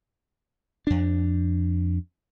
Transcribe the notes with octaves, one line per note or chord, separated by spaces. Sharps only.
F2 D4